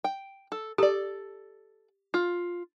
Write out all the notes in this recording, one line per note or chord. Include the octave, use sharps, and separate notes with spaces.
G5
A4
G4 A4 D5
F4